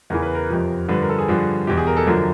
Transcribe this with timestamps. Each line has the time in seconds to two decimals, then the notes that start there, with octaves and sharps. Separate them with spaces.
0.10 E2 C#3 E3 A#4
0.23 B4
0.35 A#4
0.50 F2 C3 F3
0.88 G2 D3 F3 B4
1.02 A#4
1.09 A4
1.19 G#4
1.28 G2 D3 F3
1.67 E2 B2 G4
1.77 G#4
1.87 A#4
1.97 A4
2.07 F#2 D3 F3 A#4